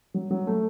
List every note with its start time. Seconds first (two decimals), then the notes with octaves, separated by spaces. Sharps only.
0.14 F#3
0.31 F#3
0.47 A3